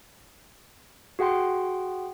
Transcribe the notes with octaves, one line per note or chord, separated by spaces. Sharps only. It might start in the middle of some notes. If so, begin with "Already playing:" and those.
F#4 G#4 F#5 G5 C6